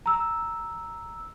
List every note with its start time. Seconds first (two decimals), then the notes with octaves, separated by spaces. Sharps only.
0.06 A#5 E6